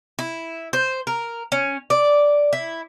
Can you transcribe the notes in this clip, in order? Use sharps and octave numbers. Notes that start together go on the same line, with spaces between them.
E4
C5
A#4
C#4
D5
E4